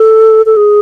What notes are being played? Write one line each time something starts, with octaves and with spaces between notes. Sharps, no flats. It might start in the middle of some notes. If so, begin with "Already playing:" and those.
Already playing: A4
A4
G#4